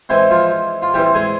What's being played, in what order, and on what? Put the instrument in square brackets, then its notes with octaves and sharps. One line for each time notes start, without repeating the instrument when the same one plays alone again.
[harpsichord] E3 G#3 C4 E4
F3 F4
F4
E3 G3 C4 G4
G#3 G#4